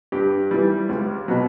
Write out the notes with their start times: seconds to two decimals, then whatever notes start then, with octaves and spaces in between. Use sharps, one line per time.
0.12 G2 G4
0.51 E3 G3
0.89 C#2
1.28 B2 F#3